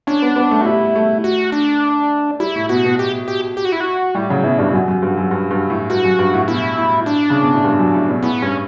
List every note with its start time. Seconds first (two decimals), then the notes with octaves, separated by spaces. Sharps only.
0.07 C#4 D4
0.22 B3
0.36 B3
0.51 A3
0.61 F#4
0.66 G3 E4
0.95 A3
1.24 F#4
1.52 D4
2.40 G3 E4
2.55 A2
2.69 B2 F#4
2.85 B2
2.99 G4
3.28 G4
3.57 G4
3.65 F#4
3.72 E4
3.80 F#4
4.15 A2 G3
4.30 C#3 F#3
4.44 B2 E4
4.58 G2 D4
4.69 E4
4.73 F#2 F#4
4.88 F#2
5.02 G2
5.17 F#2
5.31 G2
5.51 G2
5.70 A2
5.90 G2 F#4
6.04 F#2
6.19 G2
6.33 A2
6.48 B2 E4
6.77 A2
7.06 D4
7.30 C#3
7.42 B2
7.52 A2
7.64 G2
7.79 F#2
7.94 A2
8.08 B2
8.23 A2 B3
8.42 G2 C#4